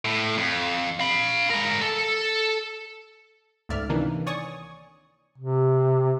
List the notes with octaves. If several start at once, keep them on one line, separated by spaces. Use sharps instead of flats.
A2
F2
F5 B5
G#3 A#4
A4
C#2 G#2 A3 D5 E5 F6
C3 D#3 E3 A#3 D4 D#4
C#5 D5 G#5 C#6 D#6
C3